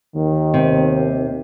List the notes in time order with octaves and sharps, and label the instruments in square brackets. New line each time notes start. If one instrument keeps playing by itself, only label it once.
[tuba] D#2 [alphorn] D#3
[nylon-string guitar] C3